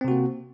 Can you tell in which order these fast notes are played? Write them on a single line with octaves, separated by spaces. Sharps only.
C4 C3 F#4 A#3